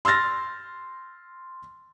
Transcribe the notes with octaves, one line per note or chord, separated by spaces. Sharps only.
C6 E6 F6 A6 A#6